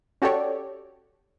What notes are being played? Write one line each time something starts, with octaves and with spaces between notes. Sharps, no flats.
C#4 F#4 G4 A4 C#5 D5